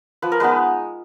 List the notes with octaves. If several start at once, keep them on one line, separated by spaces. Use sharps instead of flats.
F3 B4
A#4
G#3 B3 D#4 B4